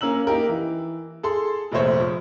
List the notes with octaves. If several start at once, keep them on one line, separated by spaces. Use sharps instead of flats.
A#3 C#4 A#5 E6 F#7
A#3 D#4 G4 A#4
E3
G#4 A4 C6
F1 A#1 A3 C5 C#5
F3